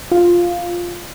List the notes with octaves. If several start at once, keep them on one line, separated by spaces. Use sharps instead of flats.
F4